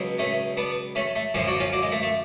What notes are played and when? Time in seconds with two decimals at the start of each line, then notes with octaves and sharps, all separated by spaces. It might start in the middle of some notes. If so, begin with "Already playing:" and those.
Already playing: C#2 B2 F#3
0.19 A3 C#4
0.57 B3 D4
0.95 A3 C#4
1.15 A3
1.34 F#2 D3 F3 C#4 F4
1.48 D4 F#4
1.60 C#4 F4
1.73 D4 F#4
1.82 G#3
1.92 A3
2.02 A3